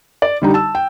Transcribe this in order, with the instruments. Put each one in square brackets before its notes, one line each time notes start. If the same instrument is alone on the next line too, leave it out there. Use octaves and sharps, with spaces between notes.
[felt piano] D5
D3 G3 D#4
A5 E6
G5